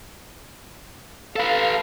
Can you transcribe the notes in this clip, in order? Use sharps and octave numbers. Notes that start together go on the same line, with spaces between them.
A4 B4 F5